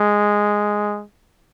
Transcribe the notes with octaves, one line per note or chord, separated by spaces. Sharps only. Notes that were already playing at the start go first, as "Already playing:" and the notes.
Already playing: G#3